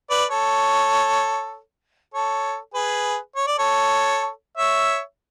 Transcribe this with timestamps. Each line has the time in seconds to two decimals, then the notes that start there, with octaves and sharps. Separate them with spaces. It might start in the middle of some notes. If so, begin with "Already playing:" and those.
0.10 B4 D5
0.31 A4 C#5
2.14 A4 C#5
2.74 G#4 B4
3.36 C#5
3.47 D5
3.59 A4 C#5
4.57 C#5 E5